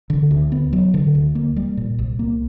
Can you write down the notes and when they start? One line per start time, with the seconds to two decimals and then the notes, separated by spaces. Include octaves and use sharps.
0.10 D3
0.31 D2
0.52 B3
0.73 F#3
0.94 D3
1.15 D2
1.35 A#3
1.56 G3
1.77 A#2
1.99 C2
2.19 A#3